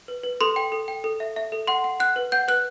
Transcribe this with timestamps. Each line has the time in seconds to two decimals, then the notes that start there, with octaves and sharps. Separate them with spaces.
0.08 B4
0.23 B4
0.41 A4 C6
0.56 G5
0.72 A4
0.88 G5
1.04 A4
1.20 E5
1.36 E5
1.52 A4
1.67 F#5 C6
1.84 F#5
2.00 F#5 F#6
2.16 B4
2.32 F#5 G6
2.48 B4 F#6